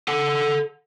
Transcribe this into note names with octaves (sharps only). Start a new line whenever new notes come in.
A4 F#5